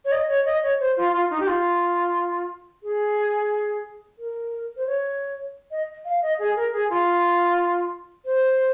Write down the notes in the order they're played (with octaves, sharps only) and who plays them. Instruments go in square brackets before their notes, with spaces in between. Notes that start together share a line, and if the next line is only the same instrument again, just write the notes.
[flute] C#5
D#5
C#5
D#5
C#5
C5
F4
F4
D#4
G4
F4
G#4
A#4
C5
C#5
D#5
F5
D#5
G#4
A#4
G#4
F4
C5